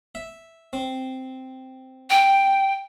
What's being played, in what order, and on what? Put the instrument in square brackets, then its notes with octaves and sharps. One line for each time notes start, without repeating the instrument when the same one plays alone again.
[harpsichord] E5
C4
[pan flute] G5